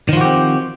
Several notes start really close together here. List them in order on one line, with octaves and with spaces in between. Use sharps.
D#3 F3 F#4 G4 C4